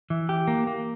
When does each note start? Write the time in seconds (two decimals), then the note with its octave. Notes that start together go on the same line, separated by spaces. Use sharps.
0.10 E3
0.29 G4
0.48 A#3
0.67 A#3